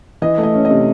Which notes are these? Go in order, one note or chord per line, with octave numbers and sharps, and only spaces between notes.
E3 D#5
A3
D#5
C#4
D#5
C3